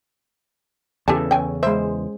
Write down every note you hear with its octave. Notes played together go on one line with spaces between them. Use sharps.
E2 C#3 E3 G4 A4 G#5 A5
C#4 G5 G#5
G#3 C5 E5